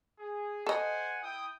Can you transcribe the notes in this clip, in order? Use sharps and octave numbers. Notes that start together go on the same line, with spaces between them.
G#4
A4 C5 D#5 F#5 G#5
E4 G5 D#6